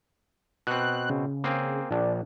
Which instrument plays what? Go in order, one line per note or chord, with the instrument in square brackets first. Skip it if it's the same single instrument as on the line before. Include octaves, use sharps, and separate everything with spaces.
[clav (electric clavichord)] B2 C4 [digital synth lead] F#6
[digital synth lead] C#3
[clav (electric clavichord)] A#3 C4 G#4
[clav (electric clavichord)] A#1 [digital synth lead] D4